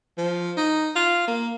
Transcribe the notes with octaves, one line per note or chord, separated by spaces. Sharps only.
F3
D#4
F4
A#3